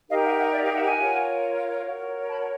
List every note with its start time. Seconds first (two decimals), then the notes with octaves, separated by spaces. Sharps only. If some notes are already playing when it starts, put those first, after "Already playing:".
0.09 D#4 G4 A#4 D#5 F5
0.24 E5 F#5
0.39 E5 F#5
0.53 D5 E5
0.64 D#5 F5
0.75 E5 F#5
0.86 F#5 G#5
0.97 F4 A#4 C#5
1.85 F#4 A#4 C#5
2.28 A5 B5